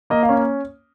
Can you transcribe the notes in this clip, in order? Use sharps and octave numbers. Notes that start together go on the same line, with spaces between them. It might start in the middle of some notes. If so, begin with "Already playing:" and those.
A#3 D#5
F5
C#4